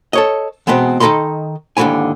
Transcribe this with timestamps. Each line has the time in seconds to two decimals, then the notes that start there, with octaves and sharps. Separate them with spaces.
0.13 A4 C#5 D#5
0.67 E2 B2 G#3 B3 C4
1.00 D#3 D#4 A4 D#5 B5 C6
1.77 D#2 G#2 D3 F#3 E4 G#5